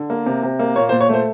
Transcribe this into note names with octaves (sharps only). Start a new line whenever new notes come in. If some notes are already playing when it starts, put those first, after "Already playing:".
Already playing: D3
A#3
C3
C3
A#3
A#2 C#5
C5
A#2
C#5
A3 C5